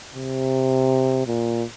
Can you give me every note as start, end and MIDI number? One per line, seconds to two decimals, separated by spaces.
0.15 1.26 48
1.27 1.64 46